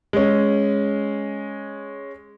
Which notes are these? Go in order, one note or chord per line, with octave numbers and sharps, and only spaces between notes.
G#3 C#4